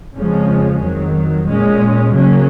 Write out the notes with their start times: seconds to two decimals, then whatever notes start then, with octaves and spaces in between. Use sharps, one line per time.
0.16 F2 C#3 F3 G#3 C#4
0.83 F2 D#3 F#3
1.49 A#2 G#3 C#4
2.16 C#3 F#3 A#3 C#4